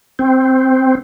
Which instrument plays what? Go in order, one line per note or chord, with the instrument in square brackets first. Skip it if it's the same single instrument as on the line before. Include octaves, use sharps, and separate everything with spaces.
[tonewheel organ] C4